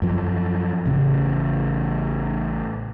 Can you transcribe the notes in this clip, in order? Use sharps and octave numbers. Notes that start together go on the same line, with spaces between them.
F#2 F3
A1 C#3